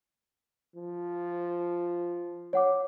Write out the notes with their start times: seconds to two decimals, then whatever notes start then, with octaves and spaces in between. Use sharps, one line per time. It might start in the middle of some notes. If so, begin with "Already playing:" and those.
0.76 F3
2.53 C#5 F#5 D6